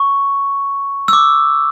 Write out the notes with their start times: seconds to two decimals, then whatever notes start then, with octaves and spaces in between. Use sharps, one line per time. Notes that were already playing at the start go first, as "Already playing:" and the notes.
Already playing: C#6
1.08 E6
1.13 D6